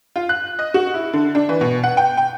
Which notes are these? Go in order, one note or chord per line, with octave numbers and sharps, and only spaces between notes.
F4
F#6
D#5
F#4
E4
D3
D4
E3
B2
F#5
G5
G5